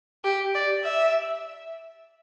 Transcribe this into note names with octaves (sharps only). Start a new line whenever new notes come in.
G4
D5
E5